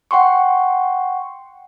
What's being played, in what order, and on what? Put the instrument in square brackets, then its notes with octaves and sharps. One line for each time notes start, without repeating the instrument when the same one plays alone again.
[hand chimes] F#5 G5 C6 C#6